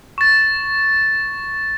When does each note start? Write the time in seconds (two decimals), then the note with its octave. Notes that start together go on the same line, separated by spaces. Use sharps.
0.18 C#6 A6